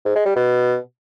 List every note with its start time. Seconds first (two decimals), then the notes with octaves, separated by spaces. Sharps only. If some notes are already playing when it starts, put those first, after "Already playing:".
0.05 G#2
0.15 G#3
0.26 G3
0.36 B2